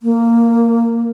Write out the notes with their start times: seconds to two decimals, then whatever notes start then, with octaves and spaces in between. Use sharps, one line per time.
0.03 A#3